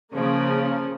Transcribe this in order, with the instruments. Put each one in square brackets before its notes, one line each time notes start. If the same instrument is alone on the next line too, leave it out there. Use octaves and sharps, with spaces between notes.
[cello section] C#3 [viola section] F3 A#3